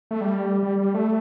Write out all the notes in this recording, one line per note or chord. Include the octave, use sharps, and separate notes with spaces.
A3
G3
G3
G3
A3